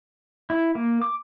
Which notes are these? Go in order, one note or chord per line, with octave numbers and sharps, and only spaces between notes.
E4
A#3
D6